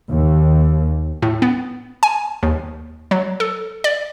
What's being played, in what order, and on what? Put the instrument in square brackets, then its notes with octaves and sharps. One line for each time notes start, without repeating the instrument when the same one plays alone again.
[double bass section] D#2
[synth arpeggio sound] A2
B3
G#5
D#2
F#3
A4
D5